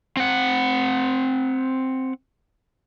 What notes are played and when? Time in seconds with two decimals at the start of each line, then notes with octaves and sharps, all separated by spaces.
0.17 C4 F#5